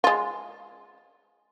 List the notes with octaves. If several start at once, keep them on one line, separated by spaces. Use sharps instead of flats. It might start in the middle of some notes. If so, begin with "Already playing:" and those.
G#3 F4